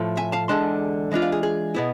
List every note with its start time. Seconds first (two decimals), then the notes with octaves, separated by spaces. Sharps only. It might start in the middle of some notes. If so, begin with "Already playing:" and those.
Already playing: A2 F3 A3
0.17 E5 G#5
0.32 F5 A5
0.48 E2 D3 G#3 D4 A5 C6
1.11 E3 G#3 D4 F4
1.22 D5 F5
1.32 G#4
1.43 G#4
1.75 B2 B3 E4